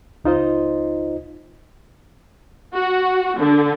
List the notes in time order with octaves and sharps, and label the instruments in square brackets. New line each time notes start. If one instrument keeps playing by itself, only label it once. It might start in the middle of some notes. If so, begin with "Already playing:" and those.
[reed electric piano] C#2 D#4 F4 C5 D#5
[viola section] F#4
D3